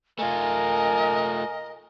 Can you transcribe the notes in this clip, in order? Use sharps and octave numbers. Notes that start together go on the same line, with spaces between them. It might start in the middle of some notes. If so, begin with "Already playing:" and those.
A3 F4 A#4 D#5 G#5